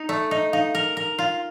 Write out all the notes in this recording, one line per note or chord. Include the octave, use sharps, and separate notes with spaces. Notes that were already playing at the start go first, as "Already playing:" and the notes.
Already playing: D#4
A3 D5
D#4 D#5
D#4 F5
A#4
A#4
F4